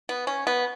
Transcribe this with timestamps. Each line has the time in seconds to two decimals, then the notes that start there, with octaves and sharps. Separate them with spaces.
0.09 B3
0.27 C#4
0.47 B3